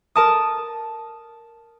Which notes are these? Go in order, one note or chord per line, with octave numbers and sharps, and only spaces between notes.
A#4 A5 D#6